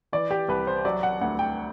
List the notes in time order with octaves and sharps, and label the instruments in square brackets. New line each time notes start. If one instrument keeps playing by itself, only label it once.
[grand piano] E3 D5
G4
C2 B4
C5
F#3 D5
F#5
D2 F#5
G5